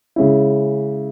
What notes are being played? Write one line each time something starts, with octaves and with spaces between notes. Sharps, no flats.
C#3 G#3 C#4 E4